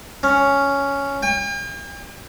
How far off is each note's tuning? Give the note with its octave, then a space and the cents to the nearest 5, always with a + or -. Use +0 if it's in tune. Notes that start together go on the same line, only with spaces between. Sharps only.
C#4 +5
G5 +45